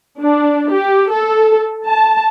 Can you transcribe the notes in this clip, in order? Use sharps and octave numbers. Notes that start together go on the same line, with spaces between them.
D4
G4
A4
A5